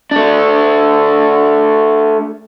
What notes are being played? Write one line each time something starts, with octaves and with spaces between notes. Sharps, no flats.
A3 D4